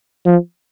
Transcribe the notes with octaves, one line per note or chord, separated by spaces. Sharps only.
F3